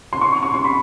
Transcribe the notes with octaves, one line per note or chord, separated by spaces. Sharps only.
C6
C#6
C#6
C#6
C6
B5